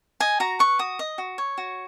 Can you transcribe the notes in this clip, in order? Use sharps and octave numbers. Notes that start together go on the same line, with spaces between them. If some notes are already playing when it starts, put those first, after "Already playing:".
D#5 G#5
F#4 A#5
B4 C#6
F#4 D#6
D#5
F#4
C#5
F#4